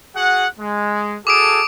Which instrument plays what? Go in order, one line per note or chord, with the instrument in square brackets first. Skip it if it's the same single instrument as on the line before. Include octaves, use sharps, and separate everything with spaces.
[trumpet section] F#4 G#4 F#5
G#3
[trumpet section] F#4 G#4 A4 [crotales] D6 D#6 D7